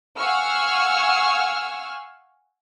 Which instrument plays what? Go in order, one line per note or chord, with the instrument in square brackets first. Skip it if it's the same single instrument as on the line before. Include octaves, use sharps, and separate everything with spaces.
[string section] F5 F#5 G#5 C#6 E6 F6